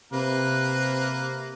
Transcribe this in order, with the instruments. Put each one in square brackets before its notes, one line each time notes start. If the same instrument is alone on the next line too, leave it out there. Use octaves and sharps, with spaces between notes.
[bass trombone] C3 [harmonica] A#3 B4